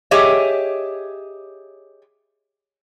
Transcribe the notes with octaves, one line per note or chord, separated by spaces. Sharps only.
G4 G#4 C#5 D#5 E5